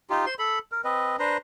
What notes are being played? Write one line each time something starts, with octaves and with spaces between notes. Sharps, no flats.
D#4 F4 G4
C5 C6
A4 B5
A#4
C4 B4 D#5
D4 B4 C5 A#5